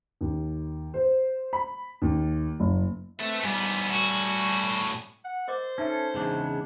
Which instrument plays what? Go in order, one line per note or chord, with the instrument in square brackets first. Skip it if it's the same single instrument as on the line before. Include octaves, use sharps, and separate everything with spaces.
[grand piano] D#2
C5
B5
D#2
F#1
[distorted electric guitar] A3 [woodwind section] C4 B4 E5
[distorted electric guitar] G#2 B3 [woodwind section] G3 G#5
[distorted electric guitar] A2 F#4
[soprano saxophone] F#5
[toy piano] A#4 D#5 D6 [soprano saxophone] C5
[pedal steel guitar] C#4 A4 [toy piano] D#4 E5 A5
[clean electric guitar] E2 G#2 D4 [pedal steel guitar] C#3